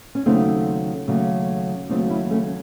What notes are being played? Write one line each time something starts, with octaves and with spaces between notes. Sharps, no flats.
C#4
D#2 C#3 F#3 A3 C4 D#4
D#2 C#3 F#3 A3
D#2 C#3 F#3 A3 C4 D#4
C#4 E4
A3 C#4